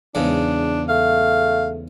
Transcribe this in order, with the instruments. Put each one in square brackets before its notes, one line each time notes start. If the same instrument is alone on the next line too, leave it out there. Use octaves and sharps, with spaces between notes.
[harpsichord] E2 G#2 C#3 [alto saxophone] D4
[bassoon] A3 [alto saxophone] F5